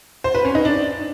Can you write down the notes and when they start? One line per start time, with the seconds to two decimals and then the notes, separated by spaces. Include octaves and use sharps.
0.24 C5
0.35 B4
0.45 C#4
0.55 D#4
0.65 D4